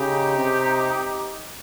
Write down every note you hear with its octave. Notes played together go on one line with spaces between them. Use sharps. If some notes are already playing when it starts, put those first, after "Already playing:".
Already playing: C#3 D#4 G4
C3